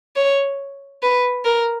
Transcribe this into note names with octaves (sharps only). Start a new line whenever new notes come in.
C#5
B4
A#4